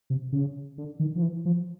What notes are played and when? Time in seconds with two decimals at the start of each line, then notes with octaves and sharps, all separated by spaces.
0.10 C3
0.32 C#3
0.78 D3
1.00 D#3
1.15 F3
1.22 E3
1.45 F3